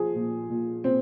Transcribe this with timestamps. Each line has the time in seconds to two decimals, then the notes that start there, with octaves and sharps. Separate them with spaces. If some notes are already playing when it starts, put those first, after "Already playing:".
Already playing: F3 G#4
0.15 A#2
0.50 A#2
0.84 A#2 C4